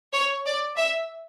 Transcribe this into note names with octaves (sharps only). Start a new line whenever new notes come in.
C#5
D5
E5